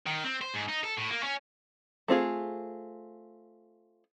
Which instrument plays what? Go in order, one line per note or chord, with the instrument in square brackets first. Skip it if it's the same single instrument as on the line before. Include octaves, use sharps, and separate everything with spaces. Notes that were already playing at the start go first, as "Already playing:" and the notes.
[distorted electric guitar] D#3
C4
C5
G#2
D#4
A4
A2
A#3
C#4
[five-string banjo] A3 C4 F4 G#4